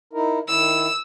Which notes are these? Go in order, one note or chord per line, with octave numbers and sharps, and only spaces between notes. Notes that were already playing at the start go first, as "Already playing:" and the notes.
D#4 E4 A#4
D#3 E4 E6